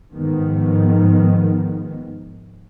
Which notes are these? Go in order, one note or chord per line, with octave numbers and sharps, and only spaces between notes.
G#2 D#3 F3 B3